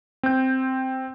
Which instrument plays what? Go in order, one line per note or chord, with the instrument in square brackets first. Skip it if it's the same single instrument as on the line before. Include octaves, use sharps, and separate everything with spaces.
[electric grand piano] C4 G6